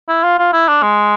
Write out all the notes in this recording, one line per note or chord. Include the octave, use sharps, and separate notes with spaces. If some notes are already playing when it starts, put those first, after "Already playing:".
E4
F4
F4
E4
D4
G#3